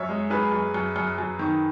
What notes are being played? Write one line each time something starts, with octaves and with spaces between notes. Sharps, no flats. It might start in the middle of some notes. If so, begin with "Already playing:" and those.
Already playing: F#2 C#5 E5
G#3
F#2 G#4 B4
F#2
F#2
F#2
F#2
D#3